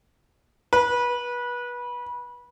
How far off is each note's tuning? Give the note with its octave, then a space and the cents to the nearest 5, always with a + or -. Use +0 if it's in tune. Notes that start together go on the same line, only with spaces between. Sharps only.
B4 -25